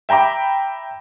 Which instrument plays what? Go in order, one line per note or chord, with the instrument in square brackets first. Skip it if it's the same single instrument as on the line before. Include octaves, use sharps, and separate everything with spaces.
[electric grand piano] E5 G5 A#5 B5 D6